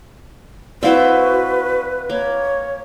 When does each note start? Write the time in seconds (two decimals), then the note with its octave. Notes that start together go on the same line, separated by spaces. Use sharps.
0.83 C4 E4 F#4 B4 C5 D5 F5 F#5
2.10 A#3 C#5